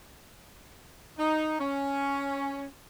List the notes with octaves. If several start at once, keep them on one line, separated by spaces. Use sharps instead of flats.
D#4
C#4